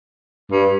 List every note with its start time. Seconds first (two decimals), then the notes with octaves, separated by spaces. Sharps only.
0.52 G2